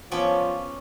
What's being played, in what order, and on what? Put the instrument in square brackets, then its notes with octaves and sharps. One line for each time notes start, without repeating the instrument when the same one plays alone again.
[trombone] F3 [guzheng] B3 C#4 D5